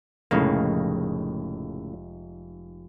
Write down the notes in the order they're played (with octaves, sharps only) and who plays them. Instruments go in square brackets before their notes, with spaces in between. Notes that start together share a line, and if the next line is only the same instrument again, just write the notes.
[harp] F1 G#3 D#4 [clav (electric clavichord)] A2 C#3 A#3